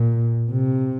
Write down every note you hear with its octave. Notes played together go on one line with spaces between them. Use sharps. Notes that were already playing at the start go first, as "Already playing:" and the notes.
Already playing: A#2
C3